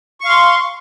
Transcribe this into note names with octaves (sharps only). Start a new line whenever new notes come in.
F5 C6 C#6